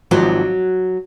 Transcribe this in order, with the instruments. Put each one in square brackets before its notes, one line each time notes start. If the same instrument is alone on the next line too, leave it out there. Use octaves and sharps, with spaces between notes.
[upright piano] G#1 G#2 F3 C4 [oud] F#3